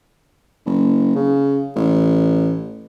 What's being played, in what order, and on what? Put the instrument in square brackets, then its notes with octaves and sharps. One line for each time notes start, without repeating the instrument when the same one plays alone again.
[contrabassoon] F#1
C#3
A1